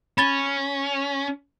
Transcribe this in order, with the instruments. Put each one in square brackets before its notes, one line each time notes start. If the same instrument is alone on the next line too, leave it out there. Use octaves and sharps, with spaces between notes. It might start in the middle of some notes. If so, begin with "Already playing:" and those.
[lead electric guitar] C#4 [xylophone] B5 A6 G7